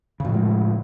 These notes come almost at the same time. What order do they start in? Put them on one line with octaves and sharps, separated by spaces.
C#3 A2 F3 G#3